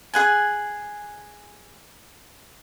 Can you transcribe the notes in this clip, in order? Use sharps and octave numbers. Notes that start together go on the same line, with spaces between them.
G#4 F#5 G#5